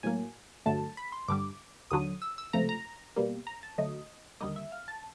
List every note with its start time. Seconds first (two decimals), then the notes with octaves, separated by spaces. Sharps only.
0.03 A2 F#3 A#3 G#5
0.66 G2 D3 F#3 A3 A5
0.97 B5
1.12 C6
1.28 G2 D3 G3 D6
1.91 D#2 D3 F#3 D#6
2.22 E6
2.38 E6
2.53 C#2 C3 F3 A3 A#5
2.69 A#5
3.16 B2 G3 A#3
3.47 A#5
3.63 A5
3.78 D2 D3 F#3 A3 D#5
4.40 D#2 D3 G3 A#3 D#5
4.56 E5
4.72 F5
4.88 A5